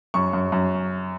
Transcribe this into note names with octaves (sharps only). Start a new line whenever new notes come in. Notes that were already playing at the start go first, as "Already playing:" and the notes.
F#2 C#6
F#2
F#2